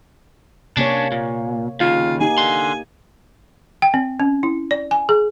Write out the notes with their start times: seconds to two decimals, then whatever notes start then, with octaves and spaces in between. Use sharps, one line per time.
0.77 C3 A#3 C#4 D4 C#5
1.12 A#2
1.80 D#2 C#3 F4
2.21 A#3 D#4 G4 G#5
2.38 D3 C6
3.82 G5
3.94 C4
4.20 C#4
4.43 E4
4.71 D5
4.91 G#5
5.09 G#4